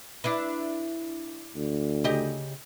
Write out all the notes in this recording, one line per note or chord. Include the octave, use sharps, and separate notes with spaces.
D4 E4 B4
D2
C#3 G4 D#5